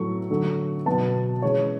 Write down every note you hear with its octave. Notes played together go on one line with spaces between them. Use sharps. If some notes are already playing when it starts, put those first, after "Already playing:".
Already playing: A2 F#3 A3 C#6
D3 F#3 A3
B2 F#3 B3 A5
C#3 E3 G#3 C#5